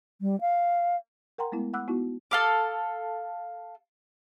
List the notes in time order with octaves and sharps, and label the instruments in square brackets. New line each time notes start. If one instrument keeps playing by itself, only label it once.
[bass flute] G3
F5
[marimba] A#4 F#5 G5 A#5 C6
G#3 A3 B3 E4
F#5 B5 D6 E6 F#6
B3 D#4 E4 F#4
[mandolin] A4 F5 D6